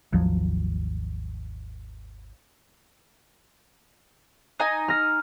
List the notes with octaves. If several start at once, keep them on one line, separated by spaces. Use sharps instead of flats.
G#1 D#2 F3 F#3
D#4 G#5
F6 A#6